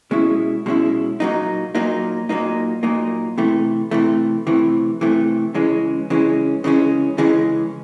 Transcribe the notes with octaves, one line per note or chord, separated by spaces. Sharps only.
B2 G#3 C#4 E4
B2 G#3 C#4 E4
A#2 F#3 A#3 D#4
A#2 F#3 A#3 D#4
A#2 F#3 A#3 D#4
A#2 F#3 A#3 D#4
C3 E3 A3
C3 E3 A3
C3 E3 A3
C3 E3 A3
C#3 E3 G#3 C#4
C#3 E3 G#3 C#4
C#3 E3 G#3 C#4
C#3 E3 G#3 C#4